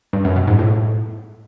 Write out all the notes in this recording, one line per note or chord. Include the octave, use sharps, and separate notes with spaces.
G2
F#2
B2
G#2
A2